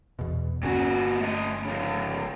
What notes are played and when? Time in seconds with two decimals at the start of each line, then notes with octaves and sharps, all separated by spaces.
0.19 E2 B2
0.63 G1 A#2 C#4 F#4
1.20 A3 D#5
1.65 C#3 F3